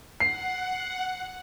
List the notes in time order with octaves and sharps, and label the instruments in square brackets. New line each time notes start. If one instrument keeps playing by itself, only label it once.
[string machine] F#5 [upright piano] C7